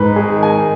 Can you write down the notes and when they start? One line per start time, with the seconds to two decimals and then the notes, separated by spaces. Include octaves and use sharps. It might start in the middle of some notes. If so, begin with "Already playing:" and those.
Already playing: G#2 B4
0.16 G#4
0.30 D#3
0.43 G#5